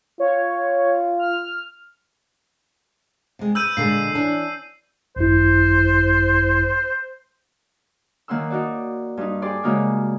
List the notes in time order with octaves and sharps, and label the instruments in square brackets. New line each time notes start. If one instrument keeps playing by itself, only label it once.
[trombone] F4 [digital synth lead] C#5
[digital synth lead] F6
[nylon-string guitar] C3 G#3
[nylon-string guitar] B4 [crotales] E6 G6 D#7
[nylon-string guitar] A#2 D3 G#3 [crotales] C7
[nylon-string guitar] E3 C#4 D4
[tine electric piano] G#1 F#2 E4 [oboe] C5
[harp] D#3 A#3 C#4 F#5 C6 E6
D#4 F#4 D5
G2 D#4
G4 G#4 D5 C6
C#3 G#3 A#3 D#4 F4 F#4